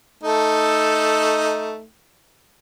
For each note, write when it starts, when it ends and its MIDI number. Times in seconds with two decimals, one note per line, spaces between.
0.23 1.82 57
0.23 1.82 63
0.23 1.82 69